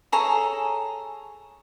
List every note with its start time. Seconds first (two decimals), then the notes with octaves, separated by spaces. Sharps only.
0.12 G#4 A4 C#5 A#5